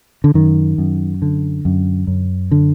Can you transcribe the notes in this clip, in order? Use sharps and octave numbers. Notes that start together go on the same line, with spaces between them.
D3
F#2 D#3
F#2
D3
F#2
F#2
D3